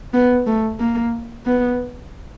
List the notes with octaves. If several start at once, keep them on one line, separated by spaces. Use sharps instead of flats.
B3
A3
A#3
B3